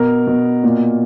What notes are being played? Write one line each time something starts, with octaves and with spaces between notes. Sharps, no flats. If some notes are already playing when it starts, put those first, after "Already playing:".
Already playing: B2 A#4
B2
A#2